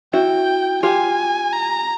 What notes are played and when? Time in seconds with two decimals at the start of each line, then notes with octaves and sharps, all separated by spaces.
0.13 E4 F#4 G5
0.83 F4 G4 G#5
1.53 A#5